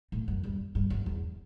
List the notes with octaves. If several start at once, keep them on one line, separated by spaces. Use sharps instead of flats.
A2
F#2
G2
G2
F#2
E2